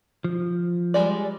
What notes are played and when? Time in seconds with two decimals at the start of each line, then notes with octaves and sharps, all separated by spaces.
0.24 F3
0.94 G3 G#3 D5